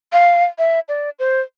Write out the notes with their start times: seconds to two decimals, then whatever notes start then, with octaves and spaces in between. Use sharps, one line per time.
0.13 F5
0.58 E5
0.88 D5
1.19 C5